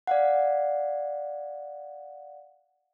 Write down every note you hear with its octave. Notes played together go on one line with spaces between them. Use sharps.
D5 F5 F#5